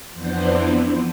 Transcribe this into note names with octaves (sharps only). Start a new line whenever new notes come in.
F2 E3 B3 D4 C5